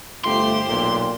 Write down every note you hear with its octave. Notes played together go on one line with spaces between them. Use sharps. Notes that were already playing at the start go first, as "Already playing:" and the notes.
G1 A3 F4 G4 C5 C6
B1 A#2